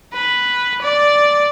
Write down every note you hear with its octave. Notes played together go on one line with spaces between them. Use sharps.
B4
D5